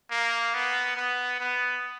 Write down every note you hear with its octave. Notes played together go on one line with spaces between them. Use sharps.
A#3
B3
B3
B3